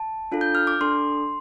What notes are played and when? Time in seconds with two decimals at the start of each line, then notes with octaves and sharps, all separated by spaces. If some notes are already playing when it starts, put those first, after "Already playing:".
Already playing: A5
0.32 D4 F4 A4
0.41 G6
0.55 F6
0.67 D6
0.81 D4 A4 C6